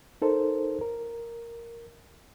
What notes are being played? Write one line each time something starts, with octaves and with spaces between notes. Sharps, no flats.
D#4 A4 A#4 C5
A#4